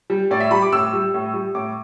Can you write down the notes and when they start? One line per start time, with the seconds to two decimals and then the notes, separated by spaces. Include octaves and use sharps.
0.10 G3
0.31 A2 D5
0.40 E5
0.51 G3 B5
0.62 D6
0.72 A2 E6
0.93 G3
1.14 A2
1.34 G3
1.55 A2 D6